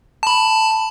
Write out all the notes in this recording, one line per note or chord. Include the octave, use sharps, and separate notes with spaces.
A5 B5